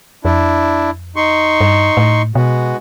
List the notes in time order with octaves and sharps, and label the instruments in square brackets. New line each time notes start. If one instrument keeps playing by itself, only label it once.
[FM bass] F2 [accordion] D4 E4
[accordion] D#4 C6 C#6
[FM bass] G2
A2
[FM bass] B2 [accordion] G#3 B3 F#4